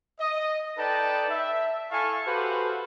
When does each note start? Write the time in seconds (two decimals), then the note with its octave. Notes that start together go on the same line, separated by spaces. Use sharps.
0.20 D#5
0.78 D#4 A4 B4 D5 G5 A5
1.31 E5
1.91 E4 A4 F5 G#5 A5 C#6
2.26 F#4 G4 A4 B4 C5 F5